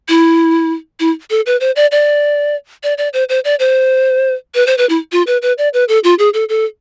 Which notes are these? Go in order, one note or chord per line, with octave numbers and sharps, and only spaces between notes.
E4
E4
A4
B4
C5
D5
D5
D5
D5
C5
C5
D5
C5
B4
C5
B4
E4
F4
B4
B4
D5
B4
A4
F4
G#4
A4
A4